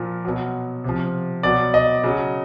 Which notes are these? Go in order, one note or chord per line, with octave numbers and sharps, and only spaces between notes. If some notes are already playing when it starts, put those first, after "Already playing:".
Already playing: A#2 F3
B2 F#3
C3 F3
B2 F#3 D5
D#5
C#3 F#3